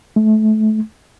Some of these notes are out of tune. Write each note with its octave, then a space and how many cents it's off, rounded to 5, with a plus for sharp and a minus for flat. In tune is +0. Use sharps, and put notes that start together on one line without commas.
A3 -25